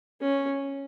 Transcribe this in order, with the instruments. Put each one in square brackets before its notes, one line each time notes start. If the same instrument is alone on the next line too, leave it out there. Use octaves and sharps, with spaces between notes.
[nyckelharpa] C#4